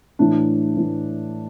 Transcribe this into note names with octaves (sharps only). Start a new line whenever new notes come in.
A2 E3 D4
A2 E3